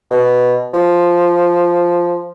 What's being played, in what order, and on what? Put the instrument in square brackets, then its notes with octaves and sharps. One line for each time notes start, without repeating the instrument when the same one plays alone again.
[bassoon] B2
F3